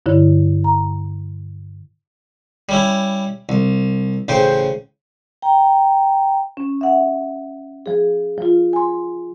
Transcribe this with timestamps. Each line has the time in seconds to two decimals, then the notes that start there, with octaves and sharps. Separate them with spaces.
0.06 G2 D3 E4 C#5
0.64 A#5
2.69 G3 C#4 E4
3.49 C2
4.28 A1 C#3 C5 G5
5.42 G5 A#5
6.57 C#4
6.81 E5 F#5
7.86 F3 G#4
8.38 F3 F4
8.73 G#5 C6